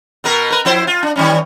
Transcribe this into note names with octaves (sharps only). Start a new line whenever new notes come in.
B2 B3 A#4
A#4 B4
F3 E4 C5
F4
D4
D#3 G3 C#4